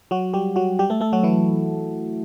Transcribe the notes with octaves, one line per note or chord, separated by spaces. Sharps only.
F#3 F#4
G3 G4
F#3 F#4
G3 G4
A3 A4
A3 A4
F#3 F#4
E3 E4